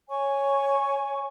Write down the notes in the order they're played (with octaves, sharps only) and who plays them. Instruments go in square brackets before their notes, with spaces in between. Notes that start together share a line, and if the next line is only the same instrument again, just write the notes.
[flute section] C#5 G#5 C#6